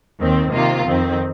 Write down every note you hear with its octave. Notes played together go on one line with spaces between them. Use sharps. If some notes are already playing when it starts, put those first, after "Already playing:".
D#2 D#3 C4
C3 D#3 A#3 F4
F2 D#3 C4